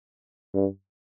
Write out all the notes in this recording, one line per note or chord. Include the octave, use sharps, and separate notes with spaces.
G2